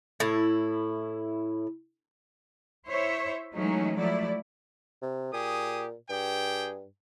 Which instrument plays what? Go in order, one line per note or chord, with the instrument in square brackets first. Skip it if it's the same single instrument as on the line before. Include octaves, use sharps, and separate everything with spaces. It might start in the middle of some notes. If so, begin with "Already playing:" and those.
[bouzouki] A2 E4
[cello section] E4 C5 C#5 E5
E3 F#3 G#3 A3 C#4 D#4
F3 F#3 A3 E4 D5
[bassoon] C3
[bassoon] A#2 [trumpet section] G4 G#4 D#6
[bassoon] G2 [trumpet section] G4 G#4 G5